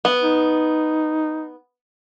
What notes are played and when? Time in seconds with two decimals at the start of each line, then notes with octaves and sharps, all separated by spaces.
0.05 B3
0.22 D#4